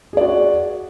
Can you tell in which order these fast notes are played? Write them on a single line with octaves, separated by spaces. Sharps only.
G#4 D5 F#4